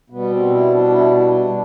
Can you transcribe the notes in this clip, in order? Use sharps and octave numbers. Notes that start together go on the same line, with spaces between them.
B2 G3 B3
C4
E4
D4
E4
D4
D4